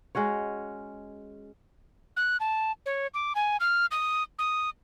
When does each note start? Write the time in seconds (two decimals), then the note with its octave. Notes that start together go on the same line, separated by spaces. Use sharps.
0.15 G#3 C#4 F#4 C#5
2.17 F#6
2.40 A5
2.86 C#5
3.14 D6
3.35 G#5
3.60 F6
3.91 D#6
4.39 D#6